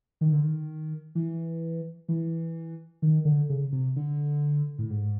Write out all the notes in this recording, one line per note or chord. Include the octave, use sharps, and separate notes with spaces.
D#3
D3
D#3
E3
E3
D#3
D3
C#3
C3
D3
A2
G#2